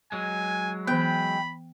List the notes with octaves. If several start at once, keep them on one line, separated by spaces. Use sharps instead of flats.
F#3 G#3 G#5
E3 B3 G5 B5